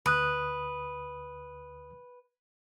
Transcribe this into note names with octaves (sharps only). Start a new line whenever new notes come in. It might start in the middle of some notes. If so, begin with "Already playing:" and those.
D2 B4 D#6 F#6